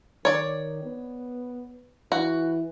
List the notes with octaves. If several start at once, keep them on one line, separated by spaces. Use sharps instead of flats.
D#3 C#5 D5
B3
E3 F#4